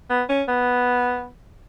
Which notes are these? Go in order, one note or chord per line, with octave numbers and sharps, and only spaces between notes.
B3
C#4
B3